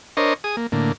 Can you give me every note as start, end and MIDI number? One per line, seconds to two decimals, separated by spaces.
0.17 0.34 62
0.17 0.34 70
0.17 0.34 72
0.17 0.34 73
0.17 0.34 75
0.44 0.56 68
0.44 0.56 87
0.57 0.67 58
0.72 0.92 45
0.72 0.92 50
0.72 0.92 58